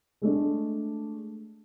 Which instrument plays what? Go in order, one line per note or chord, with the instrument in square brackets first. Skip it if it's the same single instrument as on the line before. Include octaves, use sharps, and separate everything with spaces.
[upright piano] G#3 A3 D4